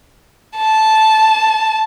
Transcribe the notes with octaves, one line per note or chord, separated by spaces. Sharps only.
A5